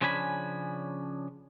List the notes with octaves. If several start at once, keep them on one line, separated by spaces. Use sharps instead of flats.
C#3 F3 C#4 D4 G#5 B5